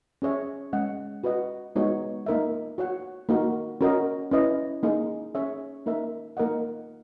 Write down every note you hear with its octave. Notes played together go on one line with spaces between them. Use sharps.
C#4 G#4 C#5 E5
G#3 C#4 G#4 D#5 F#5
F#4 B4 D#5 F#5
G#3 B3 D#4 F#4 C#5
A#3 D#4 A#4 E5
F#4 C#5 F#5
A#3 D#4 F#4 A#4
C#4 F#4 A#4 D#5
C#4 E4 B4 D#5
A#3 D#4 G#4
C#4 G#4 C#5 E5
A#3 D#4 A#4 E5
A#3 D#4 A#4 D#5 F#5